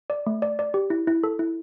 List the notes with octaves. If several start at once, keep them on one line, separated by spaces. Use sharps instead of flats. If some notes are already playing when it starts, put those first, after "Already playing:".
D5
A3
D5
D5
G4
E4
E4
A4
E4